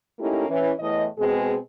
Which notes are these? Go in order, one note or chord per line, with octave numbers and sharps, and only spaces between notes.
A3 A#3 C#4 D#4 E4 G4
E3 C#4
E2 A2 D#5
B2 G#3 C4 G#4